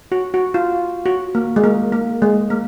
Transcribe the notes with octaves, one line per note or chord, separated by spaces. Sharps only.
F#4
F#4
F4
F#4
A#3
G#3
A#3
A#3
G#3
A#3